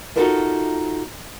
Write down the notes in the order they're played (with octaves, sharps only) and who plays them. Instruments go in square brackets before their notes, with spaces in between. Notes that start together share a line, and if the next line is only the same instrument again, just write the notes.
[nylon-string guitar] D#4 F4 F#4 A4 A#4 E5